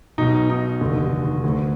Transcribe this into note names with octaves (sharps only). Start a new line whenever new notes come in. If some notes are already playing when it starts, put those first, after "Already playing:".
B1 B2 D#4
D#4
F1 D#2 D3
D2 D3